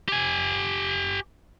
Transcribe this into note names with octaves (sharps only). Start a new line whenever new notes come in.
G4 G#5